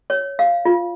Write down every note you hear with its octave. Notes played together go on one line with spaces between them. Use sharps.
C#5
F5
F4